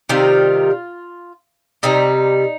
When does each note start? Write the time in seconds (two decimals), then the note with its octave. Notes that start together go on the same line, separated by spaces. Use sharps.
0.09 C3 D#3 G3 F4
1.83 C3 G3 D#4